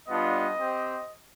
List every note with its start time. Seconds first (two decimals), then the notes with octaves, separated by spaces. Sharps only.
0.08 G3 B3 D4 F4 D#5
0.58 C4 G4